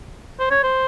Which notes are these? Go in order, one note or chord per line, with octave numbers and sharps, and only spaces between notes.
C5
C#5
C5